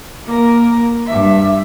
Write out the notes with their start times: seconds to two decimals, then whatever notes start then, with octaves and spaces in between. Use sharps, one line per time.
0.25 A#3 A#4
1.07 G2 E5